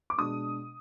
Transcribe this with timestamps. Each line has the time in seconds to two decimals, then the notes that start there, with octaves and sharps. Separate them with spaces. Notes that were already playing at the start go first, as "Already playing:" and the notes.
0.10 D6
0.18 B2 G#3 D4 D#6